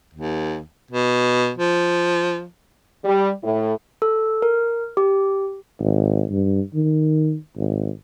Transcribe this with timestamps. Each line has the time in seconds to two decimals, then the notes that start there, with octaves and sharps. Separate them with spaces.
0.14 D#2
0.91 B2
1.58 F3
3.05 G3
3.44 A2
4.02 A4
4.42 A#4
4.97 G4
5.80 G#1
6.30 G2
6.74 D#3
7.56 G#1